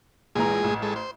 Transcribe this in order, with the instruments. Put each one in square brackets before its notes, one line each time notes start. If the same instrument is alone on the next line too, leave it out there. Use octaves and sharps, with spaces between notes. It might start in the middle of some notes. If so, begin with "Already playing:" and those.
[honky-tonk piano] A#1 E3 A#5 [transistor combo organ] G#3 G#4
[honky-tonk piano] A1
[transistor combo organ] G#3 A4
C5